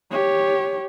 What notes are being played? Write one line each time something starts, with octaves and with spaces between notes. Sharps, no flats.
G4 C#5